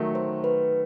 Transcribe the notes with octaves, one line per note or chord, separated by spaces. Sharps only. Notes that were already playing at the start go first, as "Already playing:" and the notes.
Already playing: D#3 F#3 A3
C5
B4